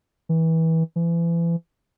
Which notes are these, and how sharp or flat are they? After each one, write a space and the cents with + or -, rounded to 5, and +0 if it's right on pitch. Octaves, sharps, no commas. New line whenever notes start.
E3 -25
E3 +35